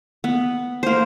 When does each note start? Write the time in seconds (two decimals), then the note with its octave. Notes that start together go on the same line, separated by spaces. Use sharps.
0.24 B3
0.83 A#3 C5